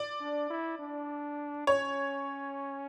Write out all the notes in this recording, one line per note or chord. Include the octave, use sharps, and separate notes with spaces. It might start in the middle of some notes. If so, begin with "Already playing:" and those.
Already playing: D5
D4
E4
D4
C#4 C#5